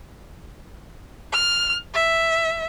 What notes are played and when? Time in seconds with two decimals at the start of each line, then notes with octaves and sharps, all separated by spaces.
1.33 F6
1.94 E5